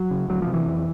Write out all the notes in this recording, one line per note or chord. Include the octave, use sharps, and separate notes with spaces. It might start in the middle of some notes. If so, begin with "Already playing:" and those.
Already playing: F#3
C#3
D2 F#3
C3 F3
E3
F2